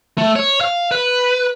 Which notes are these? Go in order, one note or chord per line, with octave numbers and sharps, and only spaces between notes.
A3
C#5
F5
B4